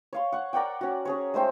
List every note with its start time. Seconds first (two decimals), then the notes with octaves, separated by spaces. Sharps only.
0.13 C#5 F5 C6
0.32 F#5 C#6
0.53 A#4 D5 F#5 G5
0.81 C#4 F#4
1.05 C#4 G#4 C#5
1.34 G#3 A3 C5 G5